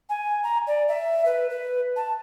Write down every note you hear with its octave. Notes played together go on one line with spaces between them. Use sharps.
G#5
A#5
D5
E5
B4
B4
A5